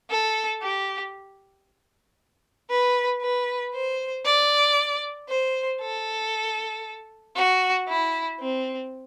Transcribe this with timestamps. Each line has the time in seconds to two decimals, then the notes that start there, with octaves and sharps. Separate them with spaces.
0.10 A4
0.62 G4
2.70 B4
3.22 B4
3.74 C5
4.25 D5
5.29 C5
5.81 A4
7.36 F#4
7.88 E4
8.40 C4